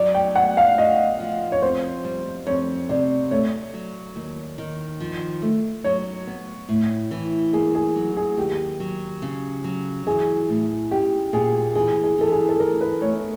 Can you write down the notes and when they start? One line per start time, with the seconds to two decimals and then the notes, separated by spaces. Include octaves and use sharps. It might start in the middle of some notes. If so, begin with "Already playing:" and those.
Already playing: F#3 D5
0.15 G5
0.36 B3 F#5
0.57 F5
0.78 F#4 D#5
1.20 F3
1.52 C#5
1.62 F2 C5
2.05 G3
2.47 F2 C#5
2.89 C3 D5
3.31 A3 C#5
3.74 F#3
4.16 D#2
4.58 D#3
5.00 F3
5.42 A3
5.84 F#3 C#5
6.27 B3
6.69 A2
7.11 E3
7.53 A#3 G#4
7.75 G#4
7.96 F#3
8.17 G#4
8.37 D#2 G4
8.80 F#3
9.22 C#3
9.64 F#3
10.06 E3 G#4
10.49 A2
10.91 C#4 G4
11.33 A#2 G#4
11.75 E3 G#4
12.04 G#4
12.18 E3 A4
12.32 G#4
12.49 A4
12.60 E3 A#4
12.81 B4
13.02 A3 C#5